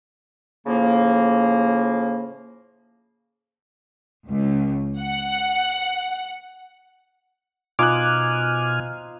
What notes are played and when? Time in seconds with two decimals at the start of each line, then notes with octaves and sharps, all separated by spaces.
0.66 A2 C#3 F3 A#3
4.27 C#2
5.02 F#5
7.79 B2 D#4 F4 C5 G#5 D6 F6 F#6